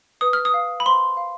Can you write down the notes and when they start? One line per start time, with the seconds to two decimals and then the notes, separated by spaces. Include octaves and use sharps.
0.21 B4 D#6
0.33 F6
0.45 D#6
0.54 F5
0.80 B5
0.86 C5 C6
1.17 F5